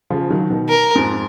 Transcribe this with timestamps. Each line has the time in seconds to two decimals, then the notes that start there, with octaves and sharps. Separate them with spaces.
0.10 C#3 F3
0.30 D#3 F#3
0.50 B2 D#3
0.69 A#4
0.95 F2 G#2